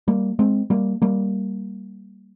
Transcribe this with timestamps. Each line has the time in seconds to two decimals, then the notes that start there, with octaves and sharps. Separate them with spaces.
0.08 G3 A#3
0.39 G#3 C4
0.70 G3 A#3
1.02 G3 A#3